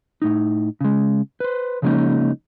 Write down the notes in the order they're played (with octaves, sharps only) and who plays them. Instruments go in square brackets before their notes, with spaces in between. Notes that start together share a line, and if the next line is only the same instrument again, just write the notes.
[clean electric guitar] A2 D#4
C#3 G#3
B4 C5
C#3 F3 G#3 A#3 C#4 D#4